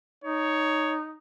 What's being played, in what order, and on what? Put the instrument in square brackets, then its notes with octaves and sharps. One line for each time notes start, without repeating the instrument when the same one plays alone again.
[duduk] D#4 [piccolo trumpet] C#5